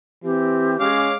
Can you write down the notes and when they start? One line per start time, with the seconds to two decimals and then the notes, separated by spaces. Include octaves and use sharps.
0.24 E3 C4 G4
0.80 G#3 C#4 C#5 F5 D6